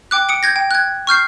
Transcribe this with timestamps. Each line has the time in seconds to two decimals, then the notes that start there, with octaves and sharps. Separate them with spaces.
0.11 G5 D6 F#6
0.29 D#6 C#7 D7
0.43 G6 G#6 A#6
0.56 G5
0.71 F#6 G#6
1.07 C#6 F6 G6 C7